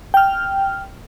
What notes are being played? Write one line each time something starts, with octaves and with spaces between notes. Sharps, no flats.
G5 F6